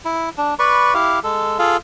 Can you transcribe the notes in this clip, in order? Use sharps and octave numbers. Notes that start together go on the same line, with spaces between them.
E4
D4
B4 D5 B5 C#6
E4 G4 F5
G#3 A4
F4 G#4 A4 F5